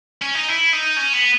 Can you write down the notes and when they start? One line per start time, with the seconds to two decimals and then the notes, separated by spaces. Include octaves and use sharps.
0.22 C#4
0.35 D#4
0.48 E4
0.73 D#4
0.96 C#4
1.13 B3